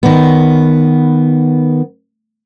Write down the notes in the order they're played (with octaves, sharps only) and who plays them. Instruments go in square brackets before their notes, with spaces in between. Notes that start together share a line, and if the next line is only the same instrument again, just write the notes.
[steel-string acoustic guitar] D#3 B3